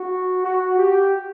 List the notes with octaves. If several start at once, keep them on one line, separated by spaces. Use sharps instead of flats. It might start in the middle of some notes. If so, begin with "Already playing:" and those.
Already playing: F#4
F#4
G4